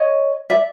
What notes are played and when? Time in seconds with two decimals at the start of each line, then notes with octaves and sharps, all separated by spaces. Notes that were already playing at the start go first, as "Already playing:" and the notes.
Already playing: C#5 D#5
0.50 D5 E5